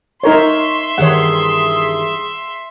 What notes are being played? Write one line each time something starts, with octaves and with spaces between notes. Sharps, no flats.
D#4 A#4 C#5 E5 C6 C#6
G2 D#3 E3 G#4 C#5 F#5